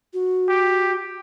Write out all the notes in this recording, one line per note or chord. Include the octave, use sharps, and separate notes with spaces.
F#4
G4